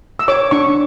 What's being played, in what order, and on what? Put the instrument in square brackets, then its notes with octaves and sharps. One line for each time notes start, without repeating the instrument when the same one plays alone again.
[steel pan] E6
C#5 D6
D4 C#6